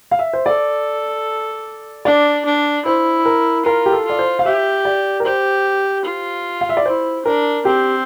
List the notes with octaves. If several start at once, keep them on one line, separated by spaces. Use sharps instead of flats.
F5
E5
C5
A4 D5
D4 D5
D4
E4 C5
A#4
F4 A#4
G4
A4
F4 D5
C5
F5
G4 E5
D5
A#4
G4 C5
F4
F5
E5
D5
E4 C5
D4 A#4
C4 G4